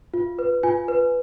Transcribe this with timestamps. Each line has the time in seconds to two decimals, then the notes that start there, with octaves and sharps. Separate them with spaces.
0.14 F4
0.39 B4
0.63 F4 G#5
0.88 B4